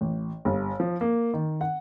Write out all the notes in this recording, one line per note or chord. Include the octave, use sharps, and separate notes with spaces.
A1
G1
F3
A#3
D#3
F#5